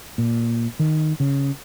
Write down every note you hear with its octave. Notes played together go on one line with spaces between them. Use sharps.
A#2
D#3
C#3